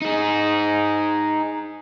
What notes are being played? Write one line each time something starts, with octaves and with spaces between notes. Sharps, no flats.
D#4 G#4